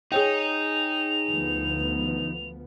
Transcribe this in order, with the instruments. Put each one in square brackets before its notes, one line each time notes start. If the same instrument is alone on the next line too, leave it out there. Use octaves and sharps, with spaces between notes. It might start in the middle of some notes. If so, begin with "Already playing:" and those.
[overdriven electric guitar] D#4 [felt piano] G#4 C#5 G5 [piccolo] F7
[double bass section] D2 F3 B3